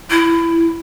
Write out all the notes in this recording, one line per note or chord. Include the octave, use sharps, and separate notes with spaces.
E4